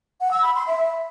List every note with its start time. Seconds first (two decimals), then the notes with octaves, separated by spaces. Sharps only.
0.21 F#5
0.32 E6
0.43 B5
0.54 C6
0.65 E5